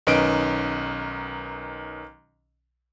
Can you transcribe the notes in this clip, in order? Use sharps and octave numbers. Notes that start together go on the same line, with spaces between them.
B1 D#3 C#4 B4 D#5 D7